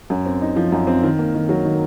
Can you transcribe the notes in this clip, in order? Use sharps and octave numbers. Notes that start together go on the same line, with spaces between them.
F#2
C4
D#4
F3
F#2
C4
D#3
A#3
D#3
F#3
D#3